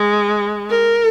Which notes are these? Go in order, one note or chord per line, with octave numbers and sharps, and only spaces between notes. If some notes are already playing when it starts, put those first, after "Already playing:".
Already playing: G#3
A#4